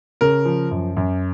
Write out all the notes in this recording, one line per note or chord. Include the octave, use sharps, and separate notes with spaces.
C#3 A#4
F3
F#2
F#2